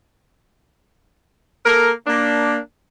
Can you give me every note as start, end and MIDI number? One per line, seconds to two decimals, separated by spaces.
1.65 1.90 58
1.65 1.90 69
1.65 1.90 70
2.07 2.58 58
2.07 2.58 62